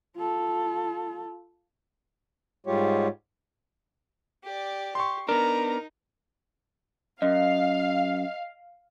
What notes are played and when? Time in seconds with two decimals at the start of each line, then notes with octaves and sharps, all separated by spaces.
0.16 F4 A4
2.67 G#2 G3 G#3 F4 G4 C#5
4.44 G4 D5
4.95 G4 C6 C#6
5.29 B3 D4 D#4 A#4 A#5
7.22 F#2 D#5 F5